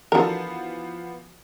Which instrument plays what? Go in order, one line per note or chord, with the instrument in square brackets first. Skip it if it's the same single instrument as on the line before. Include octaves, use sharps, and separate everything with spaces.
[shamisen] D3 A#4 [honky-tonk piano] E3 F3 B3 [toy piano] F#4 D#6